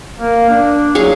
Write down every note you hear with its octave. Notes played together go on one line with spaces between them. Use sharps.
A#3
D4
F#3 G#4 F5